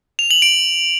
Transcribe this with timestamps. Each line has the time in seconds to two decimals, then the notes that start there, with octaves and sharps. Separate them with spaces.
0.19 F7
0.31 F#7
0.42 D7